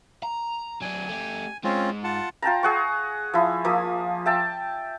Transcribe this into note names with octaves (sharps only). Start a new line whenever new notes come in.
A#5
F#3 D4 G#5
A3 G4
G#2 G#3 C4 C#4 F4
F4 F#5 A5
F4 G5 A5 A#5
G#4 F#5 C#6
F3 E4
F3 A#3 D#6
E5 G5 A5